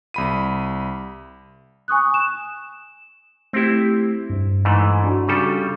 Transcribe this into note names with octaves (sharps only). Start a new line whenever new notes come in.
C2 B5 D#7
G#5 C#6 D#6 F#6
E7
A3 C4 E4 G4
G2
G#2 E3 A3
D4 F#4
C#3 G3 A4